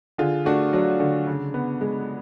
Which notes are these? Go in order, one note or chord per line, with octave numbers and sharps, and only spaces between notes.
D3 F4 G#4
A3 D4 F#4
F#3 D4
D3
C#3
B3
G#3